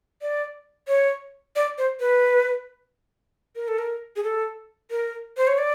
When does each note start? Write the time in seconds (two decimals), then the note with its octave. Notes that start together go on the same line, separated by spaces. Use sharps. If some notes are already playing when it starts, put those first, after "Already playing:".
0.22 D5
0.88 C#5
1.56 D5
1.78 C5
2.00 B4
3.56 A#4
3.68 A4
3.78 A#4
4.16 G#4
4.23 A4
4.91 A#4
5.37 C5
5.47 C#5
5.58 D5